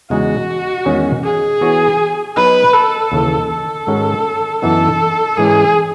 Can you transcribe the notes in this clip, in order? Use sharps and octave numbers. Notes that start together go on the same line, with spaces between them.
E2 C#3 G#3 D#4 F#4 G#4
E2 D#3 G#3 C#4 G#4
G#4
E3 B3 F#4 C#5
F#3 B3 D#4 B4
A4
D#2 C#3 E3
A4
G#2 D#3 G#3 C#4 F#4
F#2 E3 B3 D#4 A4
G#2 E3 G#3 C#4 G#4